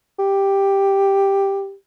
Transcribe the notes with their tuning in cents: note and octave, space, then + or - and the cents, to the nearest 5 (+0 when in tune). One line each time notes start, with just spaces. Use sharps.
G4 +5